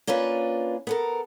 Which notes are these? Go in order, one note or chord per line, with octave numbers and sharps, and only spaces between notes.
A#3 C#4 D4 F4 B4
B3 A4 A#4